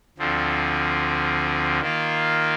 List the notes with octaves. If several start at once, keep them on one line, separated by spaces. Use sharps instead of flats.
D2 D3 F3 C4
D#3 A#3 F4